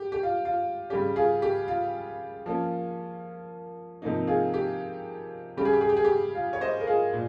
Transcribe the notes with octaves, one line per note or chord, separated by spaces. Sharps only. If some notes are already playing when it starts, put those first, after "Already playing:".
Already playing: G4
G4
F4
F4
C#3 G3 C#4 G4
F4 G#4
G4
F4
F3 A#3 C#4
C3 F3 A#3 D#4
F4 G#4
G4
C#3 G3 C#4 G4
G#4
G4
G#4
G4
G#4
G4
F4
C#5
C5 D#5
A#4
F4 G#4
A#2